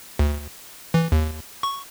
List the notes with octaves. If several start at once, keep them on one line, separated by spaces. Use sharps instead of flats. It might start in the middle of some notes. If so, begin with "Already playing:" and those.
D2
E3
D#2
C#6